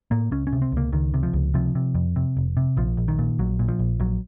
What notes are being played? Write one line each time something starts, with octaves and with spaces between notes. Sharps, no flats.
A2 A#3
C#2 C#4
C#4
C3
C4
C#2 A#3
C#2 D#3
C3
F3
C#2
C3 F3
C3
F2
C3
F1
C3
A#1 F3
A#1
D#3
A#2
A#1 F#3
A#2
F3
A#1
A#1 F#3